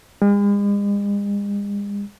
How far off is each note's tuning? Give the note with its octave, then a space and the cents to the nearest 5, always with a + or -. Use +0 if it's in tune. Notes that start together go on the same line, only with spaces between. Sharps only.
G#3 -45